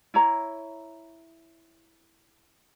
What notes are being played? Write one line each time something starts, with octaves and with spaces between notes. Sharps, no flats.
E4 C#5 A#5